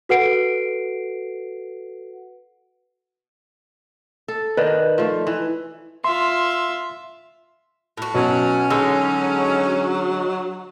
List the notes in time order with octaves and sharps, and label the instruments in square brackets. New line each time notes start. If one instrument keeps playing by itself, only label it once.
[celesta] F#4 A4 B4 F#5 C7 D7
[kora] A4
[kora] D#3 [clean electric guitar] B4 D5 D#5
[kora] F3 A3
E3
[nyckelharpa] F4 E5 [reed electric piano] C6
[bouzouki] A2 F#4
[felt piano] B2 [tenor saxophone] F#3 [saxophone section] C#4
[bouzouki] D3 G#3 D#4 [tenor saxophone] F#3 [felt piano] E6